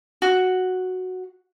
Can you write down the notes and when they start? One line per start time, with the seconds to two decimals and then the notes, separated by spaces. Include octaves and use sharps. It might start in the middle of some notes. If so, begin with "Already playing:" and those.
0.22 F#4